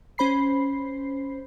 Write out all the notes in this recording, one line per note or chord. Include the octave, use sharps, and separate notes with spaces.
C#4 C5 B5 C7